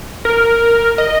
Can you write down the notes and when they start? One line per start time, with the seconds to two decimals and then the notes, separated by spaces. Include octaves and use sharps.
0.25 A#4
0.98 D#5